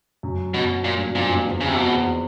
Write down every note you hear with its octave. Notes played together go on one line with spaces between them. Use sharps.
F#2
F#2 B2
A#2
G2
F#2
F2 A#2
F2
E2
C#3
C3
F2 B2
E2